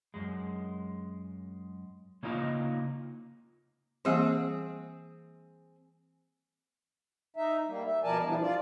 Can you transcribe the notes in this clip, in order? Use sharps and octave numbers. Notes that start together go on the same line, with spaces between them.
F#2 G#3
C#3 A#3 D#4 F4 D#5
E3 G3 A#3 C4 G#4
D#4 E5
G3 A#3
E5
B2 F3 A#4 D5 G#5 A5
E3 F3 G3 D4
F4 D5